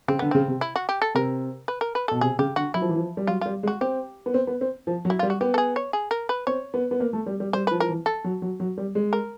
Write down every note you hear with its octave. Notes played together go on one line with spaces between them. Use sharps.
C#3 C4
D3 B3
C#3 C4
C3
E4
F#4
G4
A4
C3 A#4
B4
A#4
B4
B2 A4
C3 G#4
C#3 G4
D3 F#4
F#3 E4
F3
E3
F3
G3
F#3 F4
G3 F4
G#3
F#4
C4 G4
B3
C4
B3
C4
F3
F#3
E4
G3 F4
F#4
B3 G4
A4
G#4
C#5
G#4
A#4
B4
C4 C#5
B3
B3
A#3
A3
G3
G3
G3 C5
F3 B4
F3 A#4
E3
A4
F#3
F#3
F#3
G3
G#3
A#4